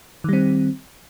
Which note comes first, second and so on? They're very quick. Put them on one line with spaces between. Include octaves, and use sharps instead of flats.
D#3 G3 C4